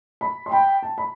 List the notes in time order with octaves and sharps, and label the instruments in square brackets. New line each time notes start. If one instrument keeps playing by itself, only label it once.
[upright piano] B5
C6
[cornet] G5 [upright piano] B5
[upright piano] A5
B5